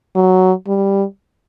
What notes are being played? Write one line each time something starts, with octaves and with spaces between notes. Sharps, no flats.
F#3
G3